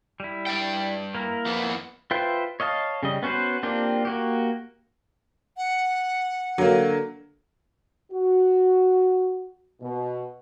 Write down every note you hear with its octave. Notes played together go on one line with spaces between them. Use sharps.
G3 E4
G2 D5 G5
A#3 E4 A#4
F2 E3 B3
F4 B4 C5 E5 G5
C#5 D#5 F5 A5
C#3 G3 D#5
B3 C#4 F#4 B4 C5
A#3 C4 D4 F4 G4
A#3 F#4 G4
F#5
D3 F#3 A#3
F#4
B2